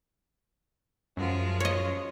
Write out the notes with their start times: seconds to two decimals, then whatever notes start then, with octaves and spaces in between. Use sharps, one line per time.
1.17 F#2 F3 G#3 F4
1.60 C#5 D#5